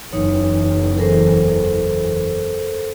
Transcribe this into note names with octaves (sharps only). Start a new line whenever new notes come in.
F#1 E2 E3 D#4 C#5
A4 A#4 C5